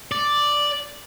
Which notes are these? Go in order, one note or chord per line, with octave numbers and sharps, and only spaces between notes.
D5